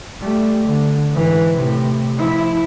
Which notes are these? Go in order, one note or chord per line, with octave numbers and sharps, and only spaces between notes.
G3 A3
D3
G#2 E3
A2 C3
F3 E4